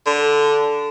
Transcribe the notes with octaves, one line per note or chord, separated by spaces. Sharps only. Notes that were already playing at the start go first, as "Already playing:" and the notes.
D3